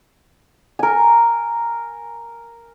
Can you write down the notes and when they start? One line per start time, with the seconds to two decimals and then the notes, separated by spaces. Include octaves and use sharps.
0.79 A#4 G#5